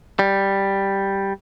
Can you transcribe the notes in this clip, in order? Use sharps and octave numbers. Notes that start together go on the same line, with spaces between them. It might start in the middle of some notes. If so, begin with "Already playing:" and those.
G3